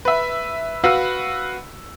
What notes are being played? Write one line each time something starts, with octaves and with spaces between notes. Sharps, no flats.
B4 E5
F#4 B4 F5 B5 E6